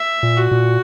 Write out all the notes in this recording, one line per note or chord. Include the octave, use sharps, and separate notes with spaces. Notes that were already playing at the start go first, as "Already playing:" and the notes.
Already playing: E5
A#2
F#4
A#2